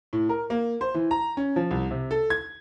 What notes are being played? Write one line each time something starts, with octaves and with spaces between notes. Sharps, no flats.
A2
A#4
A#3
C5
E3
A#5
C#4
F3
C2
C3
A4
G#6